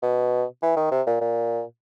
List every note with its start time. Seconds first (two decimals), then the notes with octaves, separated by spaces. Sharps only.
0.02 B2
0.62 E3
0.76 D#3
0.91 C3
1.07 A#2
1.21 A#2